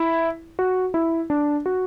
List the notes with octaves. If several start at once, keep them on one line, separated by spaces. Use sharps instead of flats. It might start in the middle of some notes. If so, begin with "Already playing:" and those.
Already playing: E4
F#4
E4
D4
F#4